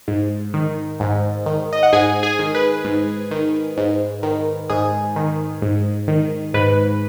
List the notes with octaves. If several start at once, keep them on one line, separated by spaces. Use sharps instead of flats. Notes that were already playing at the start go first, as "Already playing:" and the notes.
G#2
D#3
G#2
D#3
D#5
F#5
G#2 G#4 G#5
G#4 G#5
D#3
B4
G#2
D#3
G#2
D#3
G#2 G#4
D#3
G#2
D#3
G#2 B4